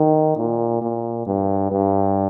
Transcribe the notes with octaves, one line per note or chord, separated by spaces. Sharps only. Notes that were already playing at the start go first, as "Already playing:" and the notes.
Already playing: D#3
A#2
A#2
G2
G2